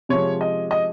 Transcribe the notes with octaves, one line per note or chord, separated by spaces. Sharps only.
C3 F3 G#3 C#5
D#5
D#5